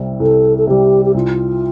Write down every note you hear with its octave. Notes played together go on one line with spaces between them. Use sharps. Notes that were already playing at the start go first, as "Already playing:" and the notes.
Already playing: C2 C3 G3
C2 A4
A4
C3 G3 G4
G4
C2 F4